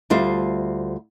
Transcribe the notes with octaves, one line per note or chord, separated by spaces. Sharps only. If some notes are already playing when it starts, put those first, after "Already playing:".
D2 G3 F4 C5